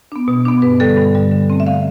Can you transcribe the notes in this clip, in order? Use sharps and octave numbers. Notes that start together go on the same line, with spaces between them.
B3 D4
B2
B3 D4
G2 B4
D3 G3 A4
G2
D3 G3
D3
A3 C4
E5
D3 F5